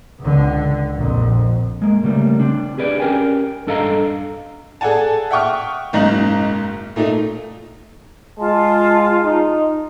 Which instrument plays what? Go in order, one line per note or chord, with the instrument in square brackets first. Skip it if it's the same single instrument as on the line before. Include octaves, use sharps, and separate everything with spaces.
[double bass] C#2 D3
A#1 F2
[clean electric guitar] G#3 A#3
C#3 F#3 G3 A3 A#3
C4 D4
G4 G#4 B4 D5
C#4 G4 A#4 G5 G#5
G2 D4 A4 D#5 F5 A#5
[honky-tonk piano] G#4 A4 D5 F#5 G#5 A5
E5 F#5 G5 C#6 D#6 F6
F#1 B1 G#2 D#5 A#5 F#7
A#2 A3 D#4 F4
[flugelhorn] G#3 [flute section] F4 A5
[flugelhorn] D#4